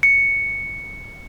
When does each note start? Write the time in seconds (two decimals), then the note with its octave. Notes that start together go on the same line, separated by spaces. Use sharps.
0.03 C#7